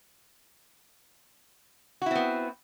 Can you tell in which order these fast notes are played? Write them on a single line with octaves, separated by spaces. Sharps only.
F#4 E4 C4 B3